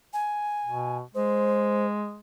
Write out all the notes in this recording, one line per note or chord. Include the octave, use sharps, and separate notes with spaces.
G#5
B2
G#3 C5